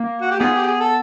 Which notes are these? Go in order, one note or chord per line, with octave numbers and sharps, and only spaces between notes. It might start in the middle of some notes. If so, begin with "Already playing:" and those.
Already playing: A#3
F#4
G4
B3 D#4 F4 G#4
G4
G#4
A4